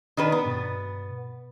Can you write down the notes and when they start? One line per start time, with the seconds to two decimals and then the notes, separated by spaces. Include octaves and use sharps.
0.17 D#3 D4 B4
0.32 B3
0.45 G2 B2 A6